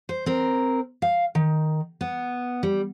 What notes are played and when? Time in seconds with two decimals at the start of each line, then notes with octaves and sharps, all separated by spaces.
0.09 C5
0.26 C4 A#4
1.02 F5
1.35 D#3
2.01 B3
2.63 G3